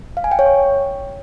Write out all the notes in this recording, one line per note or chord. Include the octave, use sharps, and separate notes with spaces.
F5
G#5
G5
C#5
C#6